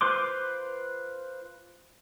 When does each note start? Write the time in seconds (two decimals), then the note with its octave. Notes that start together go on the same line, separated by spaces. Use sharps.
0.01 F4 B4 C5 C6 D6